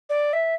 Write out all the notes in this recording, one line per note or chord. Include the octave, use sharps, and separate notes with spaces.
D5
E5